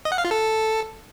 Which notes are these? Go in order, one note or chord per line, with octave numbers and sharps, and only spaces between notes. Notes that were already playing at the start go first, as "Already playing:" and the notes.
D#5
F#5
F5
F4
A4